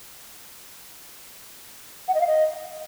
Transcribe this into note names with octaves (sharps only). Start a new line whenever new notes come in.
F#5
D#5
F5
D#5